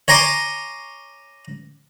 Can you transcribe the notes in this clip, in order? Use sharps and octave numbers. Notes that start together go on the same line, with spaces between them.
C#5 G#5 A#5 C6 D6